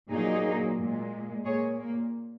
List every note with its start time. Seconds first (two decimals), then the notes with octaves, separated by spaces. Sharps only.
0.11 A#2 F#3 A#3 D#4 G#4
0.78 A#2 G#3
1.45 A#2 A#3 G#4 C#5
1.80 A#3